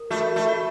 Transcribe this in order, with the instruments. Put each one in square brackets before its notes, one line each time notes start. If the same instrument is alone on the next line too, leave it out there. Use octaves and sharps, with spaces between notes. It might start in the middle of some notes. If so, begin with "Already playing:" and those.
Already playing: [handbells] A#4
[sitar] A3 [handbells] F#4
[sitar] A3
[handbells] F#4